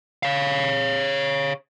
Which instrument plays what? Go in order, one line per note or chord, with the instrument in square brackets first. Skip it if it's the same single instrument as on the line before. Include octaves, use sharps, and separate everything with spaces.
[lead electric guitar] C#5 F5